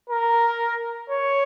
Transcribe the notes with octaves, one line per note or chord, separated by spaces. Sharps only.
A#4
C#5